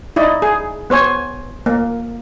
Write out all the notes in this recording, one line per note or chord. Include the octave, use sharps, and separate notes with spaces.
D#4 E4 D5 D#5
G#4
B3 C5 C#5 G#5
A#3